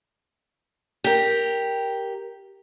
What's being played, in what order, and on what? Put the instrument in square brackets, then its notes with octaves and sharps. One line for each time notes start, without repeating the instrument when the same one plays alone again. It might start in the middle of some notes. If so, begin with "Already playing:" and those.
[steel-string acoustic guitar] G4 A#4